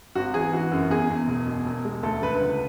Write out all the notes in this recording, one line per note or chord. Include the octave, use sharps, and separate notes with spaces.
G#1 F#4
E3 G#4
E3 F#4
F#2
E2 G#4
E2
E1
B2
E1
G#3
D2 A4
D3 B4
C#2